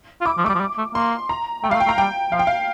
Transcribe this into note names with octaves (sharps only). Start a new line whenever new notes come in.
F4
E4 D6
F3
G3 A3 D6
F3
G3
A3
A#3 C6
A#5
A3 G5
G3 F5
A3
G5
A3
A#5
G3 G5
F3 F5
G5
F5